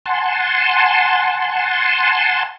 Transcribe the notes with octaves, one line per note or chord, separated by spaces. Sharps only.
F#5 G#5 A5 C6